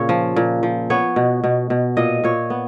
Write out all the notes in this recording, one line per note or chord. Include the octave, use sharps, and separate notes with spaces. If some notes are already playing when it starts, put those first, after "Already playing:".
Already playing: A#2 C#3 C#5
F3
A#2
F3
B3 C#5
B2
B2
B2
A#2 D#5
A#2 C#5
B3